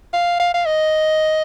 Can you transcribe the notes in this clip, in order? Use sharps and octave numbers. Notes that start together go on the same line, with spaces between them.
F5
F5
F5
D#5